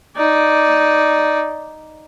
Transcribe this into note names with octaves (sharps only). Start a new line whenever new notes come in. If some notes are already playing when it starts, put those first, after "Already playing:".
D#4 D5